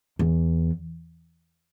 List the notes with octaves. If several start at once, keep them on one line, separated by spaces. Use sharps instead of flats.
E2